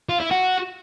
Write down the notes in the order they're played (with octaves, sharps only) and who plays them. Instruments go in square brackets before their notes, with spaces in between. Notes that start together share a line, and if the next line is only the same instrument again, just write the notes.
[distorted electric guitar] F4
E4
F#4